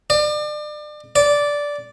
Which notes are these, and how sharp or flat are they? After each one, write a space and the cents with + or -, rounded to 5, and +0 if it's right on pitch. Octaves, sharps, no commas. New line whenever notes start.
D5 +35
D5 -10